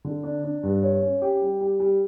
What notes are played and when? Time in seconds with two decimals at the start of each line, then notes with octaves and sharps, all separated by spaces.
0.04 D3
0.23 D4
0.44 D4
0.63 G2
0.83 C#5
1.02 C#4
1.22 G4
1.42 G3
1.60 G3
1.80 G3